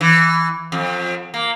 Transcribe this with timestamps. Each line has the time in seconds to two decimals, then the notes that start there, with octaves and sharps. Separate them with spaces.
0.01 E3
0.72 F2
1.34 A#3